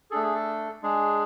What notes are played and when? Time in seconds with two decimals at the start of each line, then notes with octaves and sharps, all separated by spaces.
0.11 A3 D4 G#4 A4
0.23 G#4
0.35 A4
0.83 G#3 D4 G#4